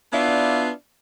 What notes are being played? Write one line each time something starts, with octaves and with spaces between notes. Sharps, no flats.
B3 D4 E4 F4 D5 F5